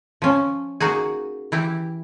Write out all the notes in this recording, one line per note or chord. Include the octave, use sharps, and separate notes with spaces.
F3 C#4
A#3 D#4 F#4 G#4
E3 E4 G4